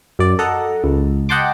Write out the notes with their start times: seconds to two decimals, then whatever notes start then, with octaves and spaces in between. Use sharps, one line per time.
0.19 F#2 D5
0.39 A4 D#5 F#5 A#5
0.84 C#2
1.29 D#5 F#5 G5 A5 C6 D6